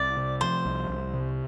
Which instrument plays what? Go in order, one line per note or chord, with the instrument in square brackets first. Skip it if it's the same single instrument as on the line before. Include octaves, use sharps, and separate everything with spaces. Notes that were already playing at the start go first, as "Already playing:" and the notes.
Already playing: [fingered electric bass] C2 [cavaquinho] D5
[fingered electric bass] C3
[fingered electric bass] F3 [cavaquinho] C5
[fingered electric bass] C2
C2
C3